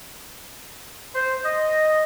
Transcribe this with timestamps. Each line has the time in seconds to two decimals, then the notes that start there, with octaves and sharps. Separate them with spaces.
1.15 C5
1.46 D#5